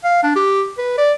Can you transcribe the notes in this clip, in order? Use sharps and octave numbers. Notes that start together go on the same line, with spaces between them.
F5
D4
G4
B4
D5